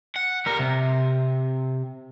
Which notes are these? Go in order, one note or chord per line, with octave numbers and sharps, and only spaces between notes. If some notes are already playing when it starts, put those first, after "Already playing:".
F#5
G3 A#4
C3